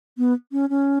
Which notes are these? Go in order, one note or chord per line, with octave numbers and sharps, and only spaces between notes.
B3
C#4
C#4